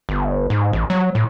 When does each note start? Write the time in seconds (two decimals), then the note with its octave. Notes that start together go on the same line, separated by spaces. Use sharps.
0.09 G1
0.50 G#2
0.73 A1
0.90 F#3
1.15 A2